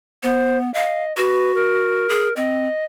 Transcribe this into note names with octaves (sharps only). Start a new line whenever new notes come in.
B3 C5
D#5 F5
F#4 B4
A#4
G#4
C4 D#5